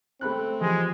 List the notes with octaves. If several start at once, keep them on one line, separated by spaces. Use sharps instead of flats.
A3 C4 B5 F#6
E3 F3 G#3 G4